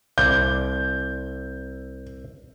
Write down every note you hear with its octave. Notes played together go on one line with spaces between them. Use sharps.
C2 D5 G6